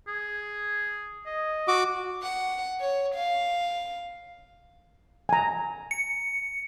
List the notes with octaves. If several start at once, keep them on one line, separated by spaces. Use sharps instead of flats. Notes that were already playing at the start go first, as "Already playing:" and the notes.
G#4
D#5
F#4 D6
F#5
C#5
F5
G#5 A#5
C#7